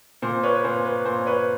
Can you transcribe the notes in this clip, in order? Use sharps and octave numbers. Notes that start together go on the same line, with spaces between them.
A#2 C5
B4 C#5
B4
A#2 C5
B4
A#2 C5
B4 C#5